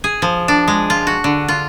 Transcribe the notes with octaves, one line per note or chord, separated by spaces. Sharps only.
G#4
F3
D4
G#3
F4
F#4
D3
F4